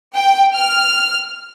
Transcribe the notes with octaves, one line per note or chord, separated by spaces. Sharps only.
G5
F6